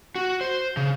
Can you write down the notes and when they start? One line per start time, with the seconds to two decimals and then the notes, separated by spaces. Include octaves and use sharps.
0.16 F#4
0.41 C5
0.77 C#3